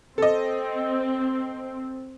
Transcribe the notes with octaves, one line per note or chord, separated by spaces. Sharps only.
C4 A4 D#5